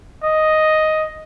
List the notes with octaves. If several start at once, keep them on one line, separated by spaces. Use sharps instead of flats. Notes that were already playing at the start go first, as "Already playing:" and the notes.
D#5